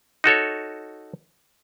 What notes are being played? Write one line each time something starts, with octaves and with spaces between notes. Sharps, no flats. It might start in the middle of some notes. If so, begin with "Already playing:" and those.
D#4 F#4 A4 C#5